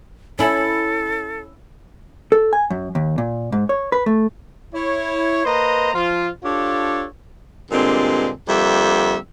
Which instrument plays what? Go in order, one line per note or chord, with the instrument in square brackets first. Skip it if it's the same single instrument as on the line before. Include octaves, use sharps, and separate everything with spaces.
[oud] C#4 E4 [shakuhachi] A4
[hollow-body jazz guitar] A4
G#5
F#2
D#2
A#2
G#2
C#5
B4
A3
[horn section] E4 C#5
A#3 B4 C5 D#5 A#5
F3 F4
D4 F4 G4 A4 C#5
[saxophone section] G2 A#2 D3 G#3 C4
F2 D3 G3 A#3 E5